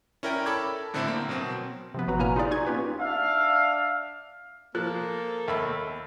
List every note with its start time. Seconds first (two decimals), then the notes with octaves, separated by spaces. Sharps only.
0.23 C#4 E4 A#4 D5 G5
0.46 A4 B5 D6 G#6
0.94 A2 D3 A3 C4 E4
1.08 A#3
1.29 B2 F#3 C4
1.94 C3 F3 B3
2.07 G#1 F#3 F#4 B4 A#5
2.19 A#2 A#3 E4 G#5 A#5 F6
2.36 D#4 F4 G4 G#4 D5
2.51 D#4 G#5 C#6 G#6
2.66 A#3 C#4 F4 G4 B4
2.99 D4 E5 F5
4.75 F3 A#3 A4 F#6
5.48 D#2 E5 B5